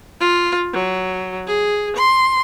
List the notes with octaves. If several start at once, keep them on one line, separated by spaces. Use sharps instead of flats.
F4
F#3
G#4
C6